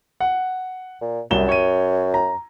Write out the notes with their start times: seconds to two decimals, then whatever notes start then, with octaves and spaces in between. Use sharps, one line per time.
0.20 F#5
1.01 A#2
1.31 C2 F#2 E7 G7
1.49 C#5 D#7
2.14 A#5